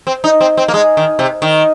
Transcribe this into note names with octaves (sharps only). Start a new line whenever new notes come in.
C4
D#4
C4
C4
A#3
G#3
D#3
C3
D#3